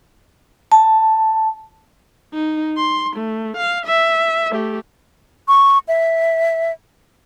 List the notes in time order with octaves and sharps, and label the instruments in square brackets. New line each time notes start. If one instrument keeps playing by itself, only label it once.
[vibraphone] A5
[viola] D#4
C6
A3
F5
E5
A3 G4
[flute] C#6
E5